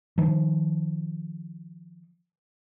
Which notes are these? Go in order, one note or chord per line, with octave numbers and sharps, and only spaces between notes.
D#3 F3